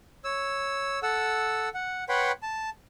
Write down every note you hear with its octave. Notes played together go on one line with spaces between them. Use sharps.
C#5 E6
A4 F#5 E6
F#5
B4 C#5 F#5 G5 B5 C6
A5